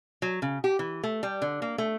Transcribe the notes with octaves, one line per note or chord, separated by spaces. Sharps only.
F#3
C#3
G4
E3
A3
G3
D3
A#3
A3